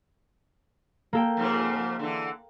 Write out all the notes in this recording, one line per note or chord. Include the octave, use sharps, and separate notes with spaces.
A#3 A4 G5
F2 G#2 C#3
D3 E3